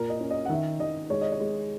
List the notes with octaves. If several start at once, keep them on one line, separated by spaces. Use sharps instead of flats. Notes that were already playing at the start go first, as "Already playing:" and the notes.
Already playing: A#2 E4 A#4
D#5
C#4
D#5
F#5
D#3 E5
D#3 D#5
G#3 C#5
D#5
C#5
G#3